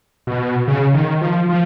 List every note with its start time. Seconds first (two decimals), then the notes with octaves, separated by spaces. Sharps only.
0.27 B2
0.68 C#3
0.94 D#3
1.21 F3
1.49 F3